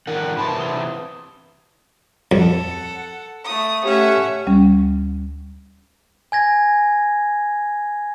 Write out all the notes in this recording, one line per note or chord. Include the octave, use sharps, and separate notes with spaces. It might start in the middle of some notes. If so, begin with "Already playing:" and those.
F2 D#3 A#4 F#5
C3 E3 A5 B5 C6
D#6 G7
F2 A4 F#5
A3 D#6
A3 C#4 G4 E5 F#5
D2 G3 C#4
G#5 G#6 A#6